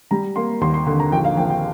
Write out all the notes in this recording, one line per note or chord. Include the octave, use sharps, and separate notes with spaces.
G3 A#5
A#3 C6
D#2 C6
C6
D3 C6
A#5
A#1 G5
F5
A#1 G5
G5